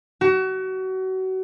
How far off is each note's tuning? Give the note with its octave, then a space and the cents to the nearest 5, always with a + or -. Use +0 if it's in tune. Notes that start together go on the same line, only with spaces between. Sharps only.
F#4 +30